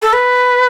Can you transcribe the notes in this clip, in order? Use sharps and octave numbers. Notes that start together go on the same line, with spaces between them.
A4
B4